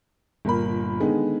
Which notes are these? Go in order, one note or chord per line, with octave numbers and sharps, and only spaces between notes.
G1 A#2 A#4 B5
D3 D#3 G#3 B3 D#4 G#4